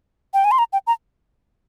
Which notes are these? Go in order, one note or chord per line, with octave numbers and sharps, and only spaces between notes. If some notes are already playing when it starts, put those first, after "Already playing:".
G5
G#5
C6
A#5
G5
A#5